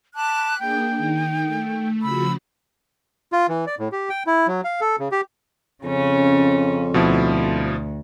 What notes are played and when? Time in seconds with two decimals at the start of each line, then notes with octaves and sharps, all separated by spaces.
0.15 A5 B5 D6 F#6
0.59 A#3 D4 G#4 G5
0.97 D#3 D#4
1.44 A3
2.02 C#3 F3 F#4 B5 E6
3.32 F4
3.49 E3
3.67 D5
3.79 A2
3.92 G4
4.10 G5
4.27 E4
4.47 F#3
4.64 F5
4.81 A4
4.99 C#3
5.12 G4
5.83 F2 C#3 C#4
6.94 D2 B2 F3 E4